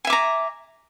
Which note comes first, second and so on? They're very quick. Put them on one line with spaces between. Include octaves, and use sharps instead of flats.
G#5 E5 D6 A#5